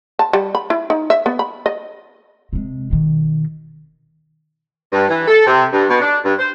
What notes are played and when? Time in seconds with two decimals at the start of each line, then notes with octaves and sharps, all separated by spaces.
0.19 A5
0.33 G3
0.55 B5
0.70 E4
0.90 D#4
1.10 E5
1.26 B3
1.39 B5
1.66 D#5
2.53 C3 G#3
2.90 B2 D#3
4.93 G2
5.08 E3
5.27 A4
5.45 C3
5.71 G2
5.89 B2
6.00 D4
6.23 G2
6.38 C5